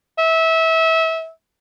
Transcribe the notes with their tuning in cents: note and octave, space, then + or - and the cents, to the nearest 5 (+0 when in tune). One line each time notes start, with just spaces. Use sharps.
E5 -25